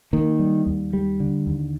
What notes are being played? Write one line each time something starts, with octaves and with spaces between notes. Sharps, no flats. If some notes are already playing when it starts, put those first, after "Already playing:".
D#3 A#3
G3
D#2
G3
D3
D#2